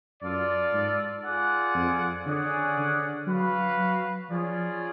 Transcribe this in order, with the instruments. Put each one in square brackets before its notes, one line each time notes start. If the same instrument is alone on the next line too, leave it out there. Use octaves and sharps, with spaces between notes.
[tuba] F#2 [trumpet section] F4 A4 D5
[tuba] G#2
[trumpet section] F4 G#4 D5 F#5
[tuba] F2
[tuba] D3 [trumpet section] C#4 G#4 D5 F#5
[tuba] D3
[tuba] F#3 [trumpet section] F#4 B4 F5
[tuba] F#3
[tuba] F3 [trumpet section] C#4 F4 G#4 D5